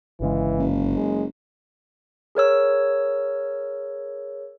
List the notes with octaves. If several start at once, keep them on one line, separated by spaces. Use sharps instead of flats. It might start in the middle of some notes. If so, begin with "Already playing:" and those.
G1 C#3 E3 G#3
F#1
G#3
G#4 A#4 C#5 E6